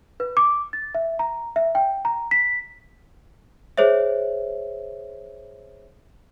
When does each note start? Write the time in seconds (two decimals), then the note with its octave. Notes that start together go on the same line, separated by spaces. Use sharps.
0.20 B4
0.37 D6
0.73 A6
0.95 E5
1.19 A#5
1.56 E5
1.75 G5
2.05 A#5
2.31 B6
3.77 G#4 C5 C#5 E5